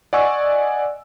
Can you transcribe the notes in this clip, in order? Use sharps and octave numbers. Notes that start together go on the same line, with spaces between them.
D5 D#5 F#5 G#5 C#6 E6